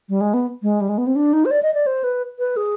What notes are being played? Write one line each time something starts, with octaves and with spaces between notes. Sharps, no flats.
G3
G#3
B3
G#3
G3
G#3
B3
C4
D4
D#4
C5
D5
D#5
D5
C5
B4
B4
G#4